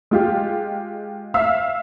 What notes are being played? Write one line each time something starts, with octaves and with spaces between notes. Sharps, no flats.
G#3 F4 G4
E5 F5 E6